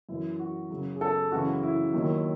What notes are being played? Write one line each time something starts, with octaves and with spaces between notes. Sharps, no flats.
F#2 E3 E4
F#4
F#2 C#3 F#3
G#4
A4
F#2 C#3 E3 F#4
E4
D#2 D#3 F#3